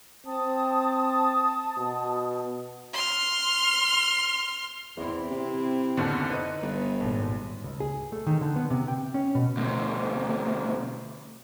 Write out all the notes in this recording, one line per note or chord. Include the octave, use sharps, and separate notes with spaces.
C4 A5 D#6
B2
C6 F6
E2 C4 E4
C3
F#1 D#2 D3
D#4 B4
G1
G#1 D#2 A#2
C#2
G#4
A3
D#3
D3
B3
C3
G5
C#4
B2
D2 B2